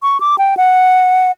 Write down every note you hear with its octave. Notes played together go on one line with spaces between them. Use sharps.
C#6
D6
G5
F#5